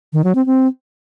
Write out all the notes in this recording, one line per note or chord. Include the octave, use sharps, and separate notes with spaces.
D#3
F#3
C4
C4